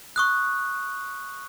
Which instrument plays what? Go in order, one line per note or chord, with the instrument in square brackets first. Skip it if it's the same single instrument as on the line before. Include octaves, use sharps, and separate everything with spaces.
[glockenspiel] C#6 D#6 F#6